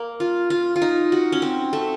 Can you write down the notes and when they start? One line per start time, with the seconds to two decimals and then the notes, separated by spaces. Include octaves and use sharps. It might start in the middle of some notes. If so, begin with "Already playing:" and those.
Already playing: A#3
0.20 F4
0.50 F4
0.76 F4
0.82 D#4
1.12 F#4
1.32 C#4
1.42 C4
1.73 A3